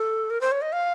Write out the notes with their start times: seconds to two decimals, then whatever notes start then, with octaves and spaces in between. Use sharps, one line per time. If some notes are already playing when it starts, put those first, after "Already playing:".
Already playing: A4
0.30 A#4
0.41 C5
0.52 C#5
0.62 D#5
0.72 F5